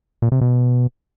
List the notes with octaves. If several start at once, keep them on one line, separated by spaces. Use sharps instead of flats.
A#2
C3
B2